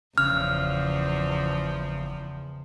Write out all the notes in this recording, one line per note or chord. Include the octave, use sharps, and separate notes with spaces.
F#1 E2 C#3 F3 F6